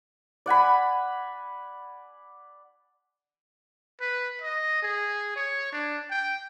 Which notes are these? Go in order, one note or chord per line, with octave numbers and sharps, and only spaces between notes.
D5 F#5 G#5 B5
B4
D#5
G#4
C#5
D4
G5